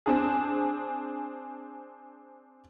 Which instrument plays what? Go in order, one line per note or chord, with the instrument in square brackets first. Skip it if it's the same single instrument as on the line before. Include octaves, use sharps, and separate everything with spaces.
[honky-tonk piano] C4 D4 G#4